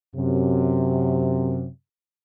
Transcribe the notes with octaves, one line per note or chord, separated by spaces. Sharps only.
F#2 C3